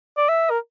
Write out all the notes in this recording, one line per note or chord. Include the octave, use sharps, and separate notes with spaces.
D5
E5
A#4